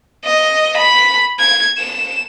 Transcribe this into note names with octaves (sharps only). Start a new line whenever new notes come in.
D#5
B5
G#6
E7